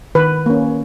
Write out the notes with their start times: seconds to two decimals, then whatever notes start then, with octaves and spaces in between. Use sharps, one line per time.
0.15 D#3 B4
0.46 A#3 C#4